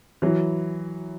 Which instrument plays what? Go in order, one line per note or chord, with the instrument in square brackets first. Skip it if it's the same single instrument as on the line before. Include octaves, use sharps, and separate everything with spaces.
[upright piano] E3 F#3